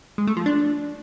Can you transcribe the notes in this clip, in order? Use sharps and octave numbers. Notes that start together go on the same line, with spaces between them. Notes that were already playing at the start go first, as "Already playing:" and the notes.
G#3
A3
F3
D4